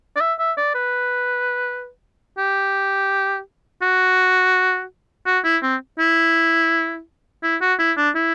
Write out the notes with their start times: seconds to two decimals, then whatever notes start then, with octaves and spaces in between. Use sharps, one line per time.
0.16 D5
0.21 E5
0.39 E5
0.57 D5
0.75 B4
2.38 G4
3.82 F#4
5.26 F#4
5.44 E4
5.63 C4
5.99 E4
7.43 E4
7.61 F#4
7.79 E4
7.97 D4
8.16 E4